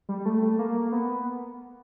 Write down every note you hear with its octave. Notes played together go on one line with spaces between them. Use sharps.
G3
A3
A3
A#3
B3